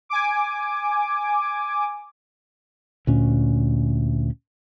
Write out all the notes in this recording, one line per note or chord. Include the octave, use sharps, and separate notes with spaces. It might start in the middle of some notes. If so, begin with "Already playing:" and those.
G#5 D6
D2 A#2 C#4